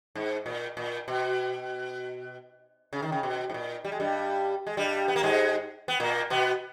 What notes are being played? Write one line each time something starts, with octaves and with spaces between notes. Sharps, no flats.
G#2
A#2
A#2
B2
C#3
D#3
C#3
B2
G#2
A#2
G3
G#3
G2 G3
G#3
G2 G3
B3
A#3
G#2 G#3
B3
A#2 A#3
B2 B3